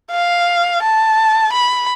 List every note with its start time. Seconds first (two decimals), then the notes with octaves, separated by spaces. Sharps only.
0.12 F5
0.82 A5
1.52 B5